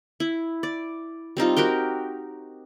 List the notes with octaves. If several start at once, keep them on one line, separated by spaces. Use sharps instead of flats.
E4
D5
G3 C4 D#4 F4
F#4 G4 A#4 G5